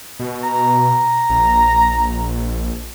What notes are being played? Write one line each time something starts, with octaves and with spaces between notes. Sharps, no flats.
B2
A#5
A#1